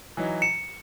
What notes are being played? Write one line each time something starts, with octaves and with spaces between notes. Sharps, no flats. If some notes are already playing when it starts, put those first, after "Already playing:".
E3 F#3 D#4
C#7 E7